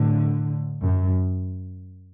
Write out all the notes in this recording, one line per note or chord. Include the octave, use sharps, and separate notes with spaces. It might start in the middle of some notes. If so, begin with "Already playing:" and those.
Already playing: A2 D3
F#2